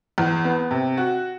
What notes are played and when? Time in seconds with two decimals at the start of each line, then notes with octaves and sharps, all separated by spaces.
0.18 E2
0.44 B3
0.71 C3
0.97 F#4